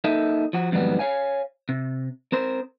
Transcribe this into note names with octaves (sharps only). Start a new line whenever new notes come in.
A#3 D#4 A4 E5
F3 F#4
F2 G#2 D#3 F#3 G3 B3
C#5 F5 G#5
C3
C4 A#4 C5